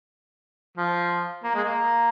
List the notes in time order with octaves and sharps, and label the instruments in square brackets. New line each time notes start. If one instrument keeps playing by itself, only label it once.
[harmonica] F3
A#3
G#3
A#3